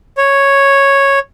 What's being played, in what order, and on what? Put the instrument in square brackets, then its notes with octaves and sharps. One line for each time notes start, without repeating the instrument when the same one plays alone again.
[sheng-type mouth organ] C#5